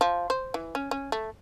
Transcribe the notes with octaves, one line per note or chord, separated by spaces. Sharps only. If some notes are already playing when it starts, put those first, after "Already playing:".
F3
C5
E3
C#4
C#4
A3